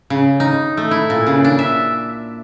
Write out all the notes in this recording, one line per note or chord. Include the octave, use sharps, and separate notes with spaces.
C#3
D#4
A3
E4
A#2
C#3
D4
E5